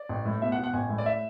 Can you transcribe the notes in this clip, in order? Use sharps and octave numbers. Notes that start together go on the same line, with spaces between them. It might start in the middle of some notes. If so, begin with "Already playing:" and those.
Already playing: D5
A1
A2
B2 E5
F#5
B2
F#5
A1 G#5
A2
D5
E5